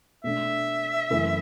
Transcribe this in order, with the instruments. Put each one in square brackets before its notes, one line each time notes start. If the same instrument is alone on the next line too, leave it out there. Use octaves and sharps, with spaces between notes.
[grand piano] B2 A3 D4 [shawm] E5
[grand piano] F#2 C#3 E3 A3 E4